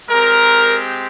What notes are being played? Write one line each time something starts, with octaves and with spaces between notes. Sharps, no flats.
G#3 C4 G4 A#4